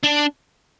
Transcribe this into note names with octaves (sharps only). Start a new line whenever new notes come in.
D4